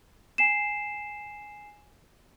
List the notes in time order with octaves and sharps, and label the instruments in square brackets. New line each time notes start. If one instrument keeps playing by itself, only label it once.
[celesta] G#5 C7 E7